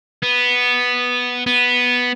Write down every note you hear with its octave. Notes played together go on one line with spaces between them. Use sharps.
B3
B3